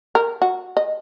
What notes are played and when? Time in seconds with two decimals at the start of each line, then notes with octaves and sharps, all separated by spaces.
0.15 A#4
0.42 F#4
0.77 D#5